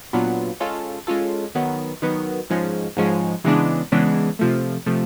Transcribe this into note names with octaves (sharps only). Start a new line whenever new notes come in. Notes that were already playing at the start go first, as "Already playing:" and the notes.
A#2 F#3 B3 D4 F4
G#3 C#4 F4 A4
G#3 C#4 F4 A4
D#3 F#3 B3
D#3 F#3 B3
G#2 F3 G#3 C#4
G#2 F3 G#3 C#4
C#3 E3 G#3 B3 D4
C#3 E3 G#3 B3 D4
C3 F3 A3
C3 F3 A3